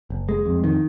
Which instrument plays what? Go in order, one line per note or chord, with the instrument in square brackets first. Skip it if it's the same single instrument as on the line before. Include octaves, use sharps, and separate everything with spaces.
[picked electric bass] F#1
G#3
F2
D#3